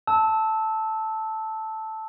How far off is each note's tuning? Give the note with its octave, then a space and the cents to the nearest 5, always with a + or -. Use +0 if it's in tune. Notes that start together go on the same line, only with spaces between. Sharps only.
A5 +0 E6 -20